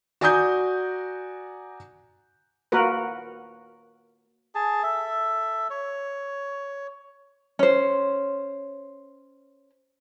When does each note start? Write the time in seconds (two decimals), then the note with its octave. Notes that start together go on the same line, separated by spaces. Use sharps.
0.21 F#4 D5 G#5 A#5 D#6 G6
2.72 A#3 F#4 A#4 B4
4.55 G#4 A5
4.83 A4 E5
5.70 C#5
7.59 C#4 C5